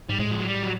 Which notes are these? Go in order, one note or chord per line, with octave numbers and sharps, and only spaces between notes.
G#2 G3
A2 G#3
F3
F#3
G3
F#3